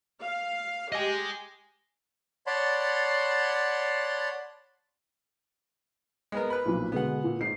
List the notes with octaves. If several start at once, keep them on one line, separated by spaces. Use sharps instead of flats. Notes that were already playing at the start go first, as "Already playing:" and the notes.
F5
G4 D#5 G#5
C#5 D5 F#5 A5 B5 C6
G#3 B3 A#4
B4 B5
B1 F2 A#2
B2 D3 G#3 B3 F#5
A#2
G#2 C7